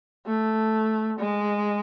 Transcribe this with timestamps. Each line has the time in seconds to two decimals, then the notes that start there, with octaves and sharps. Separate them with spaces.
0.26 A3
1.20 G#3